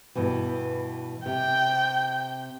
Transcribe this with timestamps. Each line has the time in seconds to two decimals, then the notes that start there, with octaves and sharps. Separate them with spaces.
0.16 G2 B2 E3
1.26 C3 G5